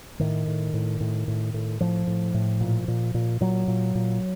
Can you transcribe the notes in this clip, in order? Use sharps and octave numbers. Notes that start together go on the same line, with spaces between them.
A2 D#3
A2
A2
A2
A2
A2
A2 F3
A2
A2
A#2
A#2
A#2
A#2 F#3
A#2
A#2